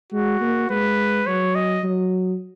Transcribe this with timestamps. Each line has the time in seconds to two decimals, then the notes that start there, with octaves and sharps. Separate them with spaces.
0.12 G#3 F#4
0.41 A#3
0.70 G#3 B4
1.26 F#3 C#5
1.55 D#5
1.84 F#3